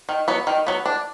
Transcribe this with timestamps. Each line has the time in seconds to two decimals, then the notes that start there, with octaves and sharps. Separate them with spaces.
0.09 D#3
0.28 F#3 B3
0.47 D#3
0.67 F#3 B3
0.86 D4